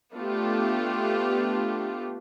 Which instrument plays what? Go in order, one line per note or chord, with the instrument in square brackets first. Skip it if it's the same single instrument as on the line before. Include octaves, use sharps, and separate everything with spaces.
[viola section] A3 B3 D4 F4 G4